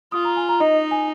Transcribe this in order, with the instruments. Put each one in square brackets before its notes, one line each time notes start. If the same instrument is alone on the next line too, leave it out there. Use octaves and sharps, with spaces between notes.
[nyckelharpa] F4 [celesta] D#6
[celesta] A#5
G#5
A#5
[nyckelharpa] D#4 [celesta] D#5
[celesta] G#5